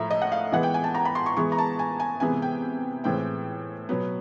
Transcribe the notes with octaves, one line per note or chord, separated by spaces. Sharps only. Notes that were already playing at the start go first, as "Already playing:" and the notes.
Already playing: A2 F3 A3 E5 A#5
D#5
F#5
F5
E3 G#3 B3 F#5
G5
G#5
A5
A#5
B5
C6
C#6
E3 G#3 B3 C#6
A#5
A5
G#5
G#5
C3 E3 G#3 B3 G#5
G5
A2 E3 G#3 C4 G5
B2 F#3 B3